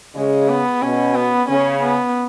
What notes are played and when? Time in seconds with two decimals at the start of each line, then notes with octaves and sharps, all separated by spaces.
0.15 C#3 G#3
0.49 B3
0.82 B2 C#4
1.16 B3
1.49 C#3 C#4
1.83 B3